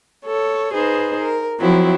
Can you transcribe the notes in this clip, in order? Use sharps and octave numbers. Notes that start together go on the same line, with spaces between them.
A4 C#5
D#4 G#4 B4 C5
A#4
F3 F#3 C4 E4